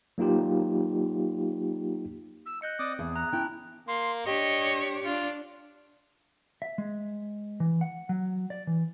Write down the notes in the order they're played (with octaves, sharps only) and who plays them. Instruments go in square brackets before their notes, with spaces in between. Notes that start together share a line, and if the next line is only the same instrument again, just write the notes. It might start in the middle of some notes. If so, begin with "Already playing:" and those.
[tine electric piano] F#3 A#3 D#4 F4 G4
[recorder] E6
[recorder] D#5 [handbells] F#6 G6 C#7
[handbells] C4 [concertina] D5 D6 D#6
[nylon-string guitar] E2 [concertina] G#4
[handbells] A#5 [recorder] F#6
[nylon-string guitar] C#4 E4 A5 [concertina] G5
[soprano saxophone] A#3 [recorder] C6
[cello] D4 C#5 [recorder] G4 [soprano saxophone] D#5
[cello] D4 [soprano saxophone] F4
[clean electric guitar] E5
G#3
E3
F#5
F#3
D5
E3